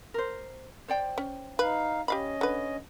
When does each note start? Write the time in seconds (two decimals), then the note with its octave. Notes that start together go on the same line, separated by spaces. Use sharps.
0.14 A#4 C5
0.88 C5 D5 G5
1.18 C#4
1.59 D#4 B4 F5
2.08 C#4 G4 D#5 F5 B5
2.41 D3 B4